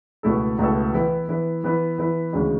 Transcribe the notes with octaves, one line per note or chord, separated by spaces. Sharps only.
C#2 B2 A3 E4 A4
C#2 B2 A3 E4 A4
E3 B3 E4 B4
E3 B3 E4 B4
E3 B3 E4 B4
E3 B3 E4 B4
D2 C#3 E3 G#3 B3